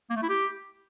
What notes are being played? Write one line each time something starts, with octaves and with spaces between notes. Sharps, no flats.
A#3
A3
E4
G4